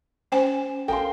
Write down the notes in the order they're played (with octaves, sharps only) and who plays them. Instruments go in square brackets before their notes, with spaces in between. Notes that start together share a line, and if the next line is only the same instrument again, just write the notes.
[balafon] C#4 C5 G#5 [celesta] G5 E7
[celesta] A4 [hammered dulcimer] A#4 F5 C6 [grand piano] G5 [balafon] G#5